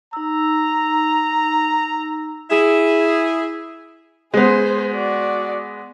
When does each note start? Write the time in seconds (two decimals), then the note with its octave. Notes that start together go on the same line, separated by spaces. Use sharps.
0.13 D#4 A#5 E6
2.51 E4 G#4
4.34 G#3 B3 G#4 C5
4.92 F#4 D5